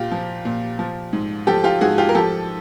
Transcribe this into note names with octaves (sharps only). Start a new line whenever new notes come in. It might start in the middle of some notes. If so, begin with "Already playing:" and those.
Already playing: A#2 F4 G4
F3
A#2
F3
G#2
F3 G4 A4
F4 G4
G#2 F#4 G#4
F4 G4
A#4
F3 G4 A4